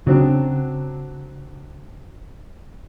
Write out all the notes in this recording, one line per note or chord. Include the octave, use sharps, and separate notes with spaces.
C#3 F#3 C4 D4